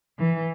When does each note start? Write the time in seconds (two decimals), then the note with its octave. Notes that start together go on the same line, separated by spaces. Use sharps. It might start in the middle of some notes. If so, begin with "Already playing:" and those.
0.19 E3